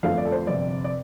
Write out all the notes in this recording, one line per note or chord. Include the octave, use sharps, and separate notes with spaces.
G1 F2 F3 A3 F5
D5
A4
C5
G1 F2 C3 D5
D5